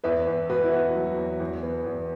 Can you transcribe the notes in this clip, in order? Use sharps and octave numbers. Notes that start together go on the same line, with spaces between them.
E2 B4 E5
E2
B2 F#4 B4
E4
E2 F#4
F#3
E2
E2
B3
E2